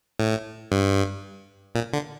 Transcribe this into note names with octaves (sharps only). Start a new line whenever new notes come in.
A2
G2
A#2
D3